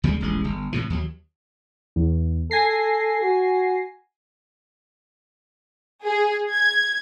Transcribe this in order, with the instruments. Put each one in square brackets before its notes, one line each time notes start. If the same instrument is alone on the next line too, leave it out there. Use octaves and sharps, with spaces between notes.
[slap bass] D2 C3 G3 G#3
D#1 A1 G#3
G1
A2 C3 E3
D#2 F#3
[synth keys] E2
[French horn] A4 [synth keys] G#5 A#6 C7
[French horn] F#4
[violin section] G#4
G#6